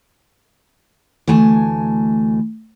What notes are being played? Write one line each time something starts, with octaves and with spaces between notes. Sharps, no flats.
D2 E3 A3 G#5 A5